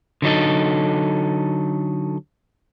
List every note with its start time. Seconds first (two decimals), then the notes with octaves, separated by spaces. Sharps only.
0.22 D3 F#3 D#4 A4